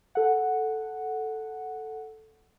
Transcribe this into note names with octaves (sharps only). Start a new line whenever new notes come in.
A4 F#5